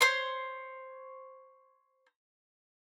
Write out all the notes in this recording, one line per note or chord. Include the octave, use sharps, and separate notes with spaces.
C5 C#5 C6